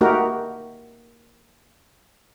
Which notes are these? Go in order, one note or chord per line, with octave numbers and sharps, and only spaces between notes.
A3 A#3 D#4 F#4 G4 A#4